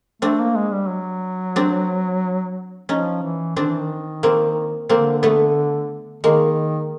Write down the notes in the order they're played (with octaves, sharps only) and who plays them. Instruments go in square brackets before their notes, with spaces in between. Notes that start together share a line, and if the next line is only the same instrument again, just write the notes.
[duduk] A3 [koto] C4 D4
[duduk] A#3
G#3
G3
F#3
[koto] C4 D4
[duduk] F3 [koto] C#4 D#4
[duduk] E3
[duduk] D#3 [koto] C4 D4
[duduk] E3
D#3
[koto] A#3 C4
[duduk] D3 [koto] A#3 C4
[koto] A3 B3
[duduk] D#3 [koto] G#3 A#3